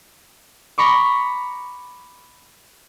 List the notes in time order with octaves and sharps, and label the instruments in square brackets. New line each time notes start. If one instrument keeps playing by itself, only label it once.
[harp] A#5 B5 C#6 D6